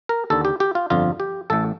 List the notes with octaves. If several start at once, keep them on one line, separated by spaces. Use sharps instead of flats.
A#4
D#2 D3 A4
G4
G4
F4
G1 F2 D3 F4
G4
A1 A2 A4